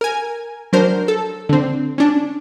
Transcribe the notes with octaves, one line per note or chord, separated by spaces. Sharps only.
A#4 G#5
F#3 D4 A#4 C5
A4
D3 C4
C#4 D4